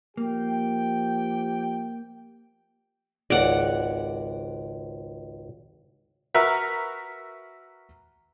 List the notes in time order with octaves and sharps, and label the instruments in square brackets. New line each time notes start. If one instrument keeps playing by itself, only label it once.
[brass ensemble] F3 G4 G5 [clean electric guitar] A#3
[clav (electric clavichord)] G#1 C#2 [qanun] D5 F#5
[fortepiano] F#4 A#4 B4 E5